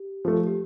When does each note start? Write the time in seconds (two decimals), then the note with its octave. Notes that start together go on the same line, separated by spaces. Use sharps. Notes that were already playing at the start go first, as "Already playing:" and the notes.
Already playing: G4
0.25 F3 A3
0.47 G4